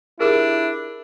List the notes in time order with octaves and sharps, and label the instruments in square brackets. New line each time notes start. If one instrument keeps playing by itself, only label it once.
[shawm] D4 [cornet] E4 [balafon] F4 G4 G#4 [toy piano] A#4